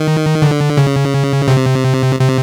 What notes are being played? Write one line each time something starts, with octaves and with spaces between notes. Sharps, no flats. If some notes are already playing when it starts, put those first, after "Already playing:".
Already playing: D#3
D3
C#3
C3
C3